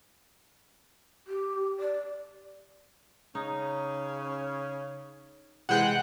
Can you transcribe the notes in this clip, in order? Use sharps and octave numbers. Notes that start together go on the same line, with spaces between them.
G4
D5
C#3 C#4 D#4
C3 E3 G#3 F#5 G5 F#6